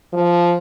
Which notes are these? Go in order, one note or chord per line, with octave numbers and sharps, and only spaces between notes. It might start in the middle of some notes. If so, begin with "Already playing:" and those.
F3